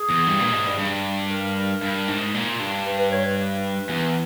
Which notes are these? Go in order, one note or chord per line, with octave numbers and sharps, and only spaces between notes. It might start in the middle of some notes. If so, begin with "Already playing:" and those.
Already playing: G#4
E2
G2
A#2
G#2
G2
G2
A#4
G2
G#2
A#2
G2
B4
B4
C#5
B4
E2